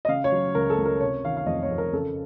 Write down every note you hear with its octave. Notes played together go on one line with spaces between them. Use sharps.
D#5
C#3 F5
C#5
F#3
C#2 A#4
A4
C#2
A#4
C3 C#5
D#3 F5
F5
F2 D#5
C#5
F2
A#4
C#3 A4